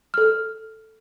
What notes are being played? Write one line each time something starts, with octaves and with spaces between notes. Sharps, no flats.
A4 F6